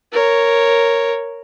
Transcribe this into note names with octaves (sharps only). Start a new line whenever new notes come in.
A#4 C#5